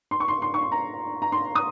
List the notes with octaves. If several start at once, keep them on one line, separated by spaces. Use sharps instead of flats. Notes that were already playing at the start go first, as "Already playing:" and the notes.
C6
C#6
C6
C6
C#6
C6
A#5
A#5
C6
D#6